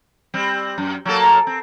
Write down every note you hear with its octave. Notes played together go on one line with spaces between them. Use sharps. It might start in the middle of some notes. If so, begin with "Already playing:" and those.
G3 C4
F#2
F#3 A#3 A4
C4